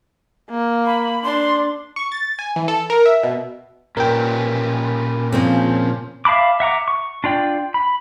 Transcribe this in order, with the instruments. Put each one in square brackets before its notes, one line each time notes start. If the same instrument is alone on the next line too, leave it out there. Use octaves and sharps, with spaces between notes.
[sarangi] A#3
[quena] B5
[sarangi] D4 [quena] C6
[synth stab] C#6
A6
G#5
E3
A4
A#4
E5
B2
[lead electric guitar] A#2 [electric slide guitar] C#4 G4 B4 [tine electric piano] A#4 G5
[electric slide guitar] C#3 [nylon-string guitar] F3 A#3 C4
[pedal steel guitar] E5 F5 A5 B5 D6
E5 F#5 A#5 D6
C#6
D4 F4 D5 G5
B5